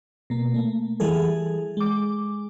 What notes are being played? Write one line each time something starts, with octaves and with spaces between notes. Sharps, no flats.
B2 A#3
A3 A#3
E3 G3 G#4 A4
G#3 D6